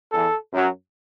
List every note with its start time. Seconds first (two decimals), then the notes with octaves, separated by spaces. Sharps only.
0.11 E2 E3 A4
0.51 F#2 F#3